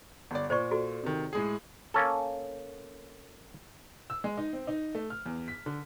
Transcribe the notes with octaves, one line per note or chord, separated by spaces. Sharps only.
G1 D5
A#2 C5 D5 C#6
F#4 A4
C3 D#3
A2 G#3 G#4
A#3 C#4 A4
E6
G#3
D#4
C4
D#4
A3
F6
E2
B6
D3